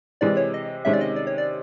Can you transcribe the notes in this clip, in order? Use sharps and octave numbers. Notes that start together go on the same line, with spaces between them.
C3 E3 G#3 D5
C#5
D#5
C3 D#3 G#3 C#4 E5
D5
D#5
D5
C#5
D5